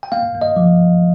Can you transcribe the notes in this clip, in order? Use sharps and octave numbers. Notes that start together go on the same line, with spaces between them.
G5
A#3 F5
A#3
D#5
F3